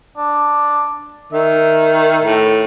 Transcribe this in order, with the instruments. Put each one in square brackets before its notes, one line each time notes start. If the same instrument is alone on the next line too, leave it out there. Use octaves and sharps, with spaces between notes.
[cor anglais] D4
[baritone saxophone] D#3 [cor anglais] E5
[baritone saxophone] A2